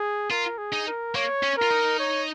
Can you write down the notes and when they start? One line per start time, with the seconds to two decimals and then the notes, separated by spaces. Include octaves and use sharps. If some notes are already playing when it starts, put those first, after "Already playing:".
Already playing: G#4
0.30 F4 A#4
0.58 G#4
0.73 D#4
0.87 A#4
1.15 A#3 C#5
1.43 C#4
1.57 F4 A#4
1.70 D#4
2.00 C#5